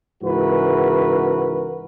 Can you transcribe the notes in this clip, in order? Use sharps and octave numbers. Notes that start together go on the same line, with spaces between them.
C#2 G#2 E3 F#4 A#4 B4